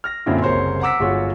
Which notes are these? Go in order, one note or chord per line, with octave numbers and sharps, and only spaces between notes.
F6 A#6
F#2 A#2 D3 C4 E4 F4
F#1 C2 A#4 C5 C#5 C6
F#5 A#5 D6 E6 B6
G1 G#3 F4 F#4 C#5